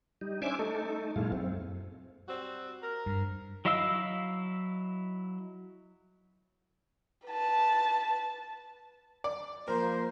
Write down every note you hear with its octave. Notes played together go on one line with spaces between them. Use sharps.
G3 D#4
C#4 D4 C5 E5 G#5 D6
A3 D#4 A4
F#2 A#2 G#3 E4 F5
F#2 C4
G3 C4 F#4
A#4
G2
F#3 E4 D#5 F5 E6
B4 A5
D5
F3 A#3 A#4 C5